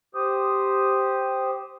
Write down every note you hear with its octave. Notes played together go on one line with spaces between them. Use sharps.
G4 C5 D#6